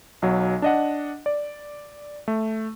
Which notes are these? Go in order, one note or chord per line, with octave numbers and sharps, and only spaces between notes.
B1 F#3
D4 D#5 F#5
D5
A3